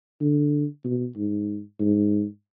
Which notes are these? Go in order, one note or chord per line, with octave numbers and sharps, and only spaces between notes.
D3
B2
G#2
G#2